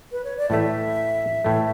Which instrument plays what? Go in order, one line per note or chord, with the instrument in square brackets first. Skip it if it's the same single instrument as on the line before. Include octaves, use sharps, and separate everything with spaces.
[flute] B4
C#5
D5
[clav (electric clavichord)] A2 E3 A3 [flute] E5
[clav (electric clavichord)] A2 E3 A3